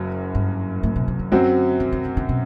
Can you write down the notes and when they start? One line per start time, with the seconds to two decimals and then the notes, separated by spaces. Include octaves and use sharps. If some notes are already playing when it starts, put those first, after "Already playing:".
Already playing: F#1 F#2 F#3
0.35 G2
0.83 A2
0.96 B2
1.08 C3
1.19 D3
1.32 F#2 D3 F#3 C4 F#4
1.80 D3
1.92 D3
2.05 D3
2.17 D3
2.29 B2